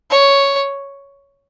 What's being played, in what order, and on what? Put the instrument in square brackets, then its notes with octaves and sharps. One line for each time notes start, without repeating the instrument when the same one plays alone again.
[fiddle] C#5